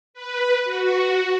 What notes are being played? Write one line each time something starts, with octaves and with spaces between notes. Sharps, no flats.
B4
F#4